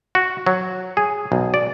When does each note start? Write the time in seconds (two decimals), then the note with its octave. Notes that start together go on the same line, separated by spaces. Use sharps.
0.15 F#4
0.46 F#3
0.97 G#4
1.32 B1
1.54 D5